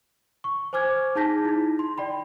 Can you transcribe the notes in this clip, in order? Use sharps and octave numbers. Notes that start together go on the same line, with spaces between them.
C#6
C5 G#5 D6 F6 G#6
D#4 G#4 A5 G6 A#6 B6
D#4 E4
C6
D5 G5 B5